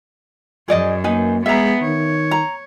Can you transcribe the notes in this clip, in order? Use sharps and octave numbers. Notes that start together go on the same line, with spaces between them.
F#2 G#4 D5 D#5
A#3 D#4 B4 G#5
G#3 B3 G#4 E5 A#5
D#3 C#5
A#5